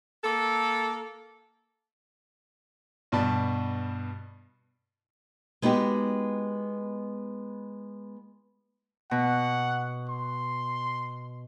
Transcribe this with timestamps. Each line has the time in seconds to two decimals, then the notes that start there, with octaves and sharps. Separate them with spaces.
0.24 A#3 A4
3.12 G2 B2 D5 A5 B5
5.62 G#3 B3 D#4 F#4 G4
9.11 B2 F#5
10.09 C6